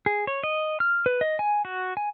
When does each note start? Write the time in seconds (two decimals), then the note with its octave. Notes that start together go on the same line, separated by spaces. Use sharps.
0.06 G#4
0.27 C#5
0.43 D#5
0.80 F6
1.06 B4
1.21 D#5
1.39 G#5
1.65 F#4
1.97 G#5